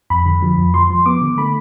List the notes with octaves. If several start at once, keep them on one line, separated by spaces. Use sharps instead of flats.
F2 B5
D3
F3
F2
F3 C6
F3
B3 D6
D3
A3 B5